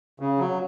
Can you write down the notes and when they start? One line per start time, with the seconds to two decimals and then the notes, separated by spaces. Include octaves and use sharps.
0.20 C#3
0.39 F#3